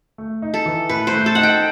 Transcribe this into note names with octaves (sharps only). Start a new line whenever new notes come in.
A3
D#4
A4
E3
A2 B4
C5
A3
A4
D#4 F#5
G5